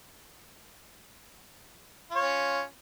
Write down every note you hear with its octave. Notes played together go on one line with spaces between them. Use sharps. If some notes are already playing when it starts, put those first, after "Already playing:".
C#4 F4 C#5